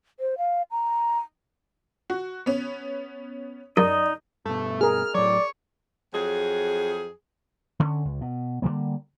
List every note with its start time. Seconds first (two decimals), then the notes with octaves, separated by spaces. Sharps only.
0.20 C5
0.38 F5
0.71 A#5
2.10 F#4
2.46 B3 C#4
3.77 F#2 D#4 D5 D#5
4.45 G2 B2 A3
4.81 G#4 A#4 F6
5.14 A2 F#3 C#5 D5
6.14 F2 F#3 G#4
7.80 D3 C#4
8.05 C#2
8.21 B2
8.62 D3 F3 G3 A#3